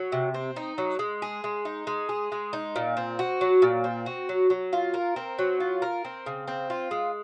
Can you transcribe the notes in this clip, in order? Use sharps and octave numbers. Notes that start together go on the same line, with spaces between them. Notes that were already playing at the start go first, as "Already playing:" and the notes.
Already playing: F#3
C3
C4
D#4
F#3
G#3
G#4
G#3
D#4
G#3
G#4
G#3
D#4
A#2
C4
F#4
F#3
A#2
C4
F#4
F#3
F#3
F4
A#4
C4
F#3
F4
A#4
C4
C#3
C4
F4
G#3